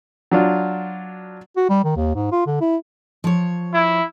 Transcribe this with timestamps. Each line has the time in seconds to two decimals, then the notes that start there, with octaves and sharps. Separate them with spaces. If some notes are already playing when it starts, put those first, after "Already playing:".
0.31 F#3 D4 F4
1.56 F#4
1.69 G3
1.84 D#3
1.96 D#2
2.15 G#2
2.32 F4
2.46 D3
2.61 E4
3.24 F3 C#5
3.74 E4